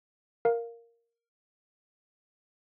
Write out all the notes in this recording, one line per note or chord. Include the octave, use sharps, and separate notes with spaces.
A#4 F5